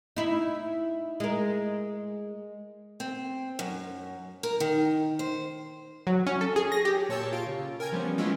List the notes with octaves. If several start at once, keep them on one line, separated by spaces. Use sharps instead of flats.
D#4 E4
G#3 A#4
C4
F#2
A#4
D#3
C5
F#3
C#4
A4
G#4
A#6
G4
A#2 C#5 A5 E6 G6
F4 D7
C#3
A#4 G5 G#5 G#6
F3 G3 B3 C#4
E3 G#3 A3 C#4 E4 F4